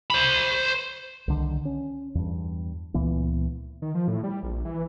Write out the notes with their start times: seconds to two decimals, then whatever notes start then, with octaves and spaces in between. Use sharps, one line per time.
0.10 C5 B5
1.28 C2 D3 D#3
1.65 C#4
2.15 E2 G2
2.94 C#2 A#2 E3 B3
3.82 D#3
3.95 F3
4.08 A2
4.24 G3
4.43 A#1
4.65 E3